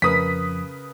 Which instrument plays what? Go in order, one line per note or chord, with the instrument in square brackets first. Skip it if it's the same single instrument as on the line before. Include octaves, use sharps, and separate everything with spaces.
[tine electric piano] F2 F3 [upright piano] C#3 A#4 B4 [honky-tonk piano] D#6 B6